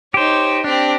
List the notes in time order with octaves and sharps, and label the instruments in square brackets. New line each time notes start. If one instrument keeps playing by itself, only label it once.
[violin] D#4 C#5 [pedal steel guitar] G4 C5
[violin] C4 G4 [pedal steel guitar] D4